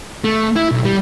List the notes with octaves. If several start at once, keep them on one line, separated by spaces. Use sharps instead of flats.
A3
E4
B1
G3